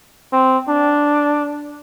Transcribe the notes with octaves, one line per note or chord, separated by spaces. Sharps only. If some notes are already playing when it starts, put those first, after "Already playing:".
C4
D4